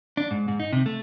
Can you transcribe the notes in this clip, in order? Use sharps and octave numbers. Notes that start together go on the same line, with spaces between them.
D4
G#2
G#2
D#4
C3
A3